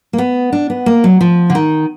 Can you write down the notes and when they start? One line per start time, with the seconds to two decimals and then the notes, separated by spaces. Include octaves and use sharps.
0.13 A#3
0.18 B3
0.53 D4
0.70 B3
0.86 A#3
1.04 F#3
1.21 F3
1.50 D3
1.55 D#3